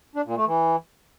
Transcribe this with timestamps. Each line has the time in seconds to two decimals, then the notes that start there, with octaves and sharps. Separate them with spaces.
0.15 D4
0.26 A#2
0.36 A3
0.46 E3